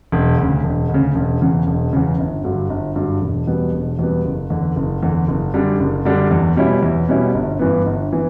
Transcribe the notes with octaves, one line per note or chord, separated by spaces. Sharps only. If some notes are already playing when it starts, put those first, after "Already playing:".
E1
D2 C#3
E1
D2 C#3
E1
E2 C#3
E1
E2 C#3
G1
G2 D3 F#3
G1
G2 D3 F#3
E1
E2 B2 G3 B3
E1
E2 B2 G3 B3
F#1
E2 D3
F#1
E2 D3
F#1
F#2 D3 G3 D4
F#1
F#2 D3 G3 D4
E2
B2 G3 C#4 E4
E2
B2 G3 C#4 E4
G1
G2 E3 B3
G1
E3 B3